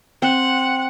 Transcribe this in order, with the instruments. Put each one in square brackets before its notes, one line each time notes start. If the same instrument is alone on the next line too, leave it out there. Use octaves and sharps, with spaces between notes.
[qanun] C4 [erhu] F#5